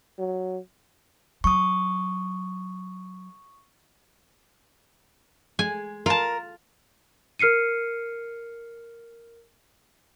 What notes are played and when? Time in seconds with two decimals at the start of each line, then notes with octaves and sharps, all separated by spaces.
0.19 F#3
1.44 F#3 C#6 D#6
5.59 G#3 G#5
6.06 F4 A#4 A5
7.39 A#4 F6 C7 C#7 D#7